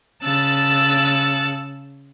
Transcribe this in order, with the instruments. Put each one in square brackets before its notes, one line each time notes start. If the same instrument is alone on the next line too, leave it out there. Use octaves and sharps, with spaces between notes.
[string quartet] C#3 A5 E6 F#6 A6